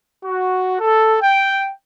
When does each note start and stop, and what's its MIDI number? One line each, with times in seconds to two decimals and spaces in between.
0.24 0.78 66
0.80 1.16 69
1.22 1.70 79